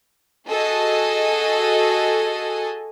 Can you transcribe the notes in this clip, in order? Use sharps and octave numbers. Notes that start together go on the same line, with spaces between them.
F#4 G#4 A4 D#5 G#5 A5